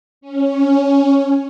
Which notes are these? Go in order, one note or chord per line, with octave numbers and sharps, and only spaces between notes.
C#4